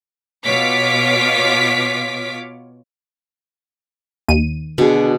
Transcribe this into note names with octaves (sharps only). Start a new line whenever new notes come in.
B2 F4 C#5 D6 B6
D#2 D#7
B2 D3 G#4